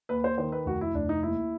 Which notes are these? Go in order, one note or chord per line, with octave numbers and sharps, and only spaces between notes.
D#2 B4
C5
D#3 C5
B4
F1 F#4
E4
F1 D4
D#4
D#2 E4